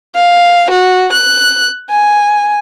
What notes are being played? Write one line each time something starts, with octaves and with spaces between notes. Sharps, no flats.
F5
F#4
F#6
G#5